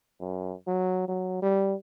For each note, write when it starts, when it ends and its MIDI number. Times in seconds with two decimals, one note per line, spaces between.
0.21 0.53 42
0.67 1.06 54
1.08 1.39 54
1.42 1.74 55